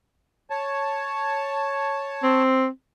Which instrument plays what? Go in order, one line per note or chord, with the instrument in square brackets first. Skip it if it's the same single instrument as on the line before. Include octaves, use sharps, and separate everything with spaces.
[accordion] C#5 A5
[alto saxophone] C4